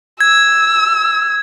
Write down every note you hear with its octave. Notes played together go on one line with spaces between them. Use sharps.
E6 G#6